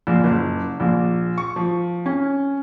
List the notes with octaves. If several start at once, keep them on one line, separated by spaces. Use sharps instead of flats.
A#1
F#1
A#1
C#6
F3
C#4